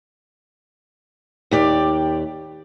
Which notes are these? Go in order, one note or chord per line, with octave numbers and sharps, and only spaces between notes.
D#2 G4 D5